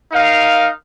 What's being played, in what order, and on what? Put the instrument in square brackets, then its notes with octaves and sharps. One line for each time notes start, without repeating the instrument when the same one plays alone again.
[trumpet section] D#4 A#4 F5